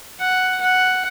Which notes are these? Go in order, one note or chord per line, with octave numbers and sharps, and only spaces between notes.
F#5
F#5